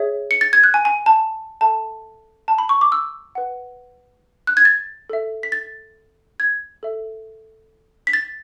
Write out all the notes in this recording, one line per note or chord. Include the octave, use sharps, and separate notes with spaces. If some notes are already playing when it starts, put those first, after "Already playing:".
Already playing: G#4 C#5 E5
C#7
A6
G#6
F#6
G#5
G#5
A5
A4 E5 A5
A5
B5
C#6
D6
E6
B4 F#5
F#6
G#6
A6
A4 E5
B6
A6
G#6
A4 E5
B6
A6